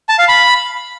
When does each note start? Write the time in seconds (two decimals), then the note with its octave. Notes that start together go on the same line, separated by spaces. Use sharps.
0.09 A5
0.19 F5
0.29 B5